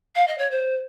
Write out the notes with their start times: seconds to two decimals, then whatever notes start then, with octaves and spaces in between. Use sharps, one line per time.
0.15 F5
0.27 D#5
0.38 C#5
0.51 C5